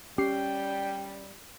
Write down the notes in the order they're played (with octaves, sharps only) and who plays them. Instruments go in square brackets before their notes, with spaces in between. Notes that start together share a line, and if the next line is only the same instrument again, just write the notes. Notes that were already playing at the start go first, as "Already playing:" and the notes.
[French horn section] G3 [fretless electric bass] C#4 [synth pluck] G4 C7 [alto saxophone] G5